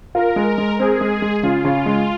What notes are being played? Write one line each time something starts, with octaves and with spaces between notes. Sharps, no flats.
F4 A#4
G#3
G#3
C4 G#4
G#3
G#3
C#3 F4
C#3
G#3